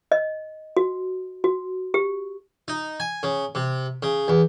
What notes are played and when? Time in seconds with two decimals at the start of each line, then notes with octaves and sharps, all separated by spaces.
0.12 D#5
0.77 F#4
1.44 F#4
1.94 G4
2.68 D#4
3.00 G#5
3.23 C#3
3.55 C3
4.03 C#3
4.28 E2